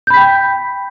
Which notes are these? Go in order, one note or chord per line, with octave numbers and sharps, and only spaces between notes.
G5 B5 G6 B6